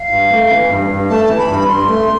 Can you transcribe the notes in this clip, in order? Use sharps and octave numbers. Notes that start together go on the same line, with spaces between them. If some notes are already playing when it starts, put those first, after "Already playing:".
Already playing: F5
G2
A3
E3
G2
G2
A3 A5
E3
B5
G2
G2 C6
A3